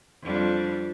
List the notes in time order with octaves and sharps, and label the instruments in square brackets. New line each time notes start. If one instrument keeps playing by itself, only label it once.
[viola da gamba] F2 G3 D4